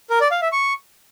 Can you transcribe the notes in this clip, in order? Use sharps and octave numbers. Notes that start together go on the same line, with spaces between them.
A#4
D5
F5
E5
C#6